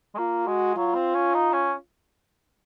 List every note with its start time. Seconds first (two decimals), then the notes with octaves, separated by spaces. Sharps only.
0.15 G#3
0.18 A#3 F4
0.47 G#3 F#4
0.76 F#3 F4
0.95 C4
1.14 C#4
1.34 D#4
1.53 C#4